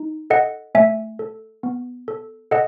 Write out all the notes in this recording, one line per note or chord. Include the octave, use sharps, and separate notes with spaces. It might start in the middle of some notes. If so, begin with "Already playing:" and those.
Already playing: D#4
A4 D#5 F#5
A3 E5 G#5
A4
B3
A4
A4 D#5 F#5